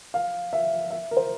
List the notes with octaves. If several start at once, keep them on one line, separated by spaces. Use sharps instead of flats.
F5
E5
E5
A#4
C5